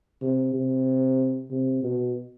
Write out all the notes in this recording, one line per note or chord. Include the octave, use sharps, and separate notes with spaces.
C3
C3
C3
B2